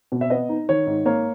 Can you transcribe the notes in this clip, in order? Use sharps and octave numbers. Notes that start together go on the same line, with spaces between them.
B2
E5
B3 D#5
D#4
D#3 C#5
G#2
A#3 C#5